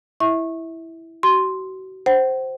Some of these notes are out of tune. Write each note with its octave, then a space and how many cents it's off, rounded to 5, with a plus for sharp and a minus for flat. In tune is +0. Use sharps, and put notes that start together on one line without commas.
E4 +0 E5 -25 C#6 -20
F#4 +35 C6 +0
C5 +0 F#5 +45